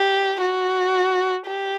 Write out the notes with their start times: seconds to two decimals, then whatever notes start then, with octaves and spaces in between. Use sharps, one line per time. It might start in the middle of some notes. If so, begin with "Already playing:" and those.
Already playing: G4
0.42 F#4
1.47 G4